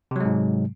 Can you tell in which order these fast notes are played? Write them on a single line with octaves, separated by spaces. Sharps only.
C3 F#3 G#3 G#2